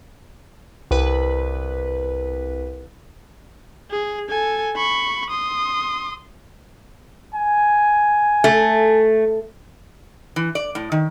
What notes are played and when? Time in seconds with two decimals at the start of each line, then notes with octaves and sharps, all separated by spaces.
0.91 C2 B4
3.90 G#4
4.29 A4 G#5
4.77 B5 C#6
5.30 C6 D#6
7.34 G#5
8.44 A3
10.36 E3
10.55 D5
10.75 A2
10.92 D#3